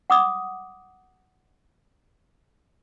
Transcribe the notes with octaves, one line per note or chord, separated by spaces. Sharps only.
F#5 D6 D#6